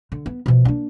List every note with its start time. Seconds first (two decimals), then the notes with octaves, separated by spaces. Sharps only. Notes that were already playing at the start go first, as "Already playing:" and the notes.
0.12 D3
0.26 B3
0.46 B2 F3
0.65 A#3 D4